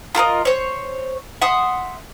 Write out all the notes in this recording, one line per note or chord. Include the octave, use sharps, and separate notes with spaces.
F4 A4 A#4 D#5
C5 C#5
E5 F#5 C6 D#6